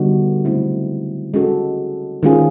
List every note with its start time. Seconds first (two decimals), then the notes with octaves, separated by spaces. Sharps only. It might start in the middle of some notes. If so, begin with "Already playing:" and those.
Already playing: D3 G3 B3 D#4 F#4
0.45 C#3 F#3 A3 C4 E4
1.34 G#3 C#4 F#4 A4
2.23 D#3 G#3 C#4 F4 G#4